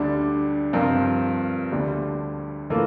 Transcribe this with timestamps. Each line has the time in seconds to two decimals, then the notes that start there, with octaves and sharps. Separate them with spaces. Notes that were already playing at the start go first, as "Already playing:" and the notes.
Already playing: D2 D3 G3 D4
0.73 G2 F3 C4 F4 A#4
1.72 D2 D3 G3
2.70 A2 E3 A#3 F4 A4